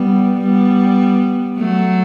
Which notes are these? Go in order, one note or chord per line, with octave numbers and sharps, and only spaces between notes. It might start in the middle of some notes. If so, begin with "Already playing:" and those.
Already playing: G3 B3
G3 B3
F#3 A3